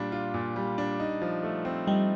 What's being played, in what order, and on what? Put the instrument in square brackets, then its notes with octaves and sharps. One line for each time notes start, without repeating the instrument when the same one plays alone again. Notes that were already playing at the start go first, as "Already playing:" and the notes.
Already playing: [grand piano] A#2 G3 D4 F4
F4
A#2
G3
D4
D#4
F3
A3
C4
[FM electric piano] G3 [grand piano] D#4